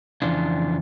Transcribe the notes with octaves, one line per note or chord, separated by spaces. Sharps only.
F2 C#3 E3 D4 F4